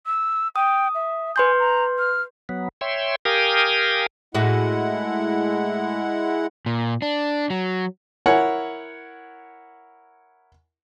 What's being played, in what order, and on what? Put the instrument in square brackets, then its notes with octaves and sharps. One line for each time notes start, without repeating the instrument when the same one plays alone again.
[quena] E6
[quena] G5 [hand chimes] D#6
[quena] E5
[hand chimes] B4 C6 G6 [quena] G#5
[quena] A#5
F6
[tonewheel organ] F#3 B3
C#5 E5 G5 C6
G4 A#4 F5 G5 G#5 D#6
[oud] A2 F#4 [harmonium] G#3 E4 F#5
[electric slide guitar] A#2
D4
F#3
[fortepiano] E4 A#4 C#5 F#5 G#5